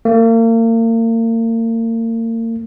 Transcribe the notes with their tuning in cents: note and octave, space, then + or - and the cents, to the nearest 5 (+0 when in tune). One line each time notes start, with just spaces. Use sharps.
A#3 -40